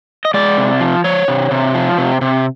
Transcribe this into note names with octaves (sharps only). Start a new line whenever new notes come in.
D#5
G#3 D5
C3
F3
F3 C#5
C3
C3
F3
C3
C3